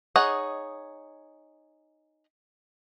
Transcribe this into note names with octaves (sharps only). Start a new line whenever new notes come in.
D#4 G#4 C#5 D#5 F#5